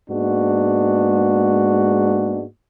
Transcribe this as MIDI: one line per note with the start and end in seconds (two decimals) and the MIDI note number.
0.10 2.45 44
0.10 2.45 56
0.10 2.45 58
0.10 2.45 59
0.10 2.45 62
0.10 2.45 66